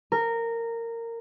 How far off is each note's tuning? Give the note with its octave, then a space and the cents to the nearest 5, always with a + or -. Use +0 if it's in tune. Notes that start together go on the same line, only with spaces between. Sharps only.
A#4 -15